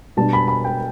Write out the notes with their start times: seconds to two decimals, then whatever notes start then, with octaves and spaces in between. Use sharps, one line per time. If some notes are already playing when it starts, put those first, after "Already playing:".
0.17 B2 G3 D4 A5
0.33 B5
0.48 B5
0.65 G5